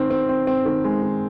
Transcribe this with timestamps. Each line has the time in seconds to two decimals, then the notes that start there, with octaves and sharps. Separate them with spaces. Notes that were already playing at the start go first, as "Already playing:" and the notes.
Already playing: D#3 C4
0.10 C4
0.29 C4
0.47 C4
0.66 D#3
0.85 G#3
1.03 D#3